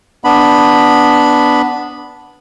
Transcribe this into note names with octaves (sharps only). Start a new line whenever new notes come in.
B3 D4 B5